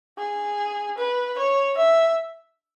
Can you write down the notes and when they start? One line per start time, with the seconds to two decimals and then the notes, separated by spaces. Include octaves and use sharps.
0.18 G#4
0.98 B4
1.38 C#5
1.77 E5